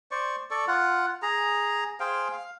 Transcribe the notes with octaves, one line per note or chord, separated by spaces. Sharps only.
C5 D5 C#6
A4 D5 C#6
F4 F#5
G#4 A#5
G#4 C5 F5 G5
F5